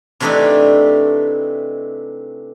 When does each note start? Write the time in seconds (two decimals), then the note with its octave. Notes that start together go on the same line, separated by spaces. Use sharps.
0.20 C3 E3 A3 D4 D#4 G4